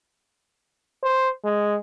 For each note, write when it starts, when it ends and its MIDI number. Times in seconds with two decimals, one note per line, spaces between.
1.03 1.29 72
1.44 1.76 56